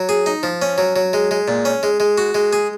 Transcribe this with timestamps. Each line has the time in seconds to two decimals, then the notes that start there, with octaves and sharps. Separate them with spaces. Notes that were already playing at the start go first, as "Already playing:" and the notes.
Already playing: F#3
0.09 G#4
0.26 D#4
0.43 F3
0.62 C#4
0.78 F#3
0.96 F#3
1.13 G#3
1.31 G#3
1.48 A#2
1.65 C#4
1.83 G#3
2.00 G#3
2.18 F#4
2.35 G#3
2.53 G#4